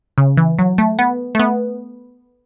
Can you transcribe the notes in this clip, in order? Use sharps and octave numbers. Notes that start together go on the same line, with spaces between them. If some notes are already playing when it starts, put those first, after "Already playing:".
C#3
E3
F#3
A3
B3
A3
B3